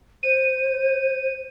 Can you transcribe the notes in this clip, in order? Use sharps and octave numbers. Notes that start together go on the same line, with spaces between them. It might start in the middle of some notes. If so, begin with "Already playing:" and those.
C5 D#7